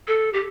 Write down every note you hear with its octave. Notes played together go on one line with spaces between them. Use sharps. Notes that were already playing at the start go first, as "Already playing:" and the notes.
A4
G4